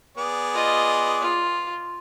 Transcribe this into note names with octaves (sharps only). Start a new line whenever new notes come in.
B3 G#4 D5
F4 D#5
F4